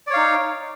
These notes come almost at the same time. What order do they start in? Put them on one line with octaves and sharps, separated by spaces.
D5 C#5 F5 D#4